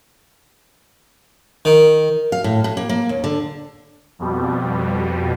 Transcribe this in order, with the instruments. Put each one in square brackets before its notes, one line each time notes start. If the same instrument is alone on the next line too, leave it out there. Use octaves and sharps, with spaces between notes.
[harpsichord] D#3
[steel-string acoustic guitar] F5
A2
A2
A#3
A#3
D#2
D3
[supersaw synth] F2 B2 G3